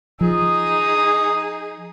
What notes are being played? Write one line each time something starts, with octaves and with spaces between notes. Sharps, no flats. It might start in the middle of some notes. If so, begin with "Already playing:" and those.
F3 D#4 G#4 D#6